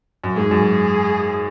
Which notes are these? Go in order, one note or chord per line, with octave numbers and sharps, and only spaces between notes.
F#2
G#2 G#4
F#2